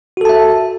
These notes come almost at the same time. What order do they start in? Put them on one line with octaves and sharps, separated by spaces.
F#4 A4 A5 E5